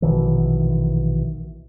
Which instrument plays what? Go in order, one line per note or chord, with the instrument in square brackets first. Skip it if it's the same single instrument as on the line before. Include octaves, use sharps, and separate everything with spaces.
[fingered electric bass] A#1 B2 D#3 E3